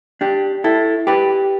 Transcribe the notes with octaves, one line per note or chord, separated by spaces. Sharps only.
D4 G4
E4 A4
G4 B4